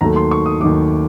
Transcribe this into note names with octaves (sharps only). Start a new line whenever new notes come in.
D#2 D#3 F#3 A3 A#5
C6
C#6
D#6
D#2 D#3 F#3 A3 D6